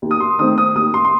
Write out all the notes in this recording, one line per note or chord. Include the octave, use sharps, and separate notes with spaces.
D#2
D#6
C6
D#3 A3 C4 D#6
D#6
D#2 D#6
C6
C6